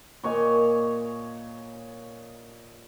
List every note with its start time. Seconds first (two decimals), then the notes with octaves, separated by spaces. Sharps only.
0.23 A#2 C#5 D#5 G#5